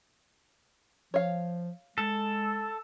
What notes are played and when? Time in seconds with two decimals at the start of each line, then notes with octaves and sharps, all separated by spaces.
1.14 F3 C#5 F5
1.98 G#3 A4